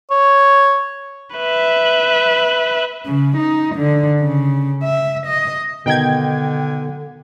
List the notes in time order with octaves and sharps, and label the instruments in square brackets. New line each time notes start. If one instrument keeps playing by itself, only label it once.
[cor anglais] C#5
[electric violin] B4 E5
[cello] C#3
D#4
D3
C#3
E5
D#5
[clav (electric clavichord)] B2 D#3 D#4 [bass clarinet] D3 [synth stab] G5 G#6